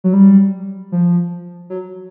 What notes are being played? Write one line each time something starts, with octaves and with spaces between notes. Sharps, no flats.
F#3
G3
F3
F#3